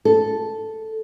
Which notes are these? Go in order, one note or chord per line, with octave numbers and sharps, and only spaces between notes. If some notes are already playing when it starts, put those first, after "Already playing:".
A4